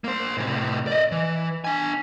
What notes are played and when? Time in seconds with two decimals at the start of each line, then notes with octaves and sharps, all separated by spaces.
0.04 A#3 C5
0.37 A2 C3
0.87 D5 D#5
1.12 E3
1.64 D4 G#5